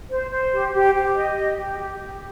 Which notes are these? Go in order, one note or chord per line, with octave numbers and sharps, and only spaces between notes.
C5
C5
G4
G4
G4
D#5
G4
G4
G4
G4